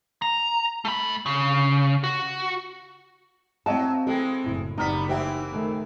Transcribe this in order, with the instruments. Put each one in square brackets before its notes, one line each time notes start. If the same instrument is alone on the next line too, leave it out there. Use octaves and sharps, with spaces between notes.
[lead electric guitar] A#5
A3 B5
C#3
F#4
[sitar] F#3 [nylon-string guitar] C4 A5 [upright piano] E4 D#5 F5
[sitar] E3 G#3 [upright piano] A4 G5
[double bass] F#1 [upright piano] A2
[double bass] F#1 [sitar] G3 B3 [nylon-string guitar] D#4 [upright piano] D#6 F6 B6
[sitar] E3 A#3 C4 [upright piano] G4 E5 F#5
[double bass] D#3 A3